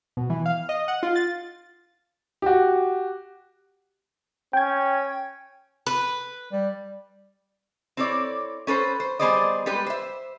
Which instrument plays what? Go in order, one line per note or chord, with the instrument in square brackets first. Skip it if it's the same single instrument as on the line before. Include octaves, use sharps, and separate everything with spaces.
[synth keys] B2
E3
F5
D#5
F#5
F4
A6
[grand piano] F#4 G4
[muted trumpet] C#4 [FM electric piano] G5 G#6
[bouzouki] B4
[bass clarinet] G3
[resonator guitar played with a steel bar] C4 E4 A4 C#5 D5
C#4 A4 B4 C5
C5
G3 B3 G#4 C5 D5 D#5
G3 G#3 G4 B4
C5 E5